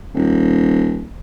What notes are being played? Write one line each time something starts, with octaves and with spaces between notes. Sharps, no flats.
D#1